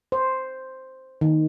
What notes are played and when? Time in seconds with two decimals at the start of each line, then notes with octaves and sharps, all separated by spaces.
0.12 C5
1.21 D#3